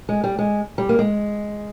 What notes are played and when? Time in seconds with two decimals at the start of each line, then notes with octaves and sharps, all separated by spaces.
0.09 G#3
0.24 G3
0.39 G#3
0.78 G3
0.89 A#3
0.99 G#3